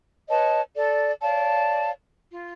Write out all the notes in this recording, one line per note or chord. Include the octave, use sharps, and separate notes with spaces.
B4 C#5 D#5 A5
A4 D5
C#5 D5 F5 A5
F4